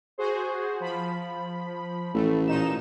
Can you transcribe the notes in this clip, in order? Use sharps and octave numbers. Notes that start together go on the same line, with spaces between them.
F#4 G#4 C5
F3 B5
A1 A3
A#2 D#4 E7